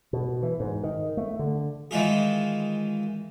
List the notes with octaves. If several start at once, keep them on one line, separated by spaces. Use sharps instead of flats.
B2
E3
G#2
D#3
A3
D3
D#3 E3 G#3 F4 G#4